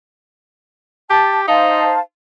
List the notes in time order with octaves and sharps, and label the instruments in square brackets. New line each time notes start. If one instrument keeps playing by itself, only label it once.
[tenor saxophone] G4 [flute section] A5
[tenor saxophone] D#4 [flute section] C5 F5 A5